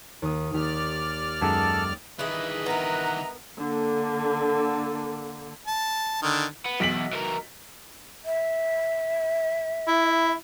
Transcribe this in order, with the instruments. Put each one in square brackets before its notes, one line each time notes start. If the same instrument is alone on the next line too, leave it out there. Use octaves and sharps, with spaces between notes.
[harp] D#2 D#6
[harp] D#2 G4 [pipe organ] D5 F6
[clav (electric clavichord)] F#2 D#3 G#3 [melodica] A4 A5 [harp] G5 D#6 G#6
[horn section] G2 B4 D#5 [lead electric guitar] D#3 E3 [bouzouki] E4 G#4
[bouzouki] B3 A#4 [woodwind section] E5 F#5 A#5
[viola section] D3 A#3
[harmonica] A5
D3 D#3
[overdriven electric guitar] B3
[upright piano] B1 B6 F#7 [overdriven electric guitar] E2
[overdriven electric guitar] E3 A#4
[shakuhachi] E5
[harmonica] E4